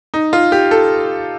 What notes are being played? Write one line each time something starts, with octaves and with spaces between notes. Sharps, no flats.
D#4
F4
G4
A4